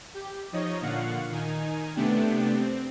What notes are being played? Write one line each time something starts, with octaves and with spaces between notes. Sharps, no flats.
G4
F3 D#4 C#5 D#5
A#2 D3 F5 F#5 C#6
D#3 D#4 G#5
C3 A3 B3 D4 G4
C4